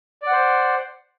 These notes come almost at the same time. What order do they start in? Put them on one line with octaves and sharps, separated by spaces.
D5 F#5 C5